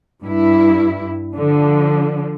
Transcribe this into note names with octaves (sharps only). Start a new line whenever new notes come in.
G2 E4
D3 F3